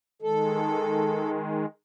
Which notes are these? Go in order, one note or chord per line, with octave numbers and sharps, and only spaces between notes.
D#3 G#3 A4